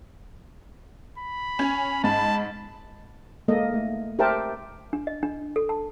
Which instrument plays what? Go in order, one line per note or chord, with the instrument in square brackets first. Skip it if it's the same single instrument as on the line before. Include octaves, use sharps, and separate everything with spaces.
[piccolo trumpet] B5
[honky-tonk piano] C#4 G#5 G#6
[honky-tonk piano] G#2 B5 [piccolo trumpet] A5
[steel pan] G#3 A#3 A4 D#5
A3
G4 A#4 C5 E5 G5 A5
[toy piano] D4
D#5
D4
A4
A5